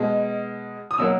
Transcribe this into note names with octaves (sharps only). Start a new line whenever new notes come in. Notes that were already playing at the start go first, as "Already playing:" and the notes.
Already playing: B2 G#3
D#6
B2 F#3 A#3 E6